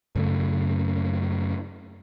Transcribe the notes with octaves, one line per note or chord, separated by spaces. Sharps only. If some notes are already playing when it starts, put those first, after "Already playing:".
F#2 C#3 A3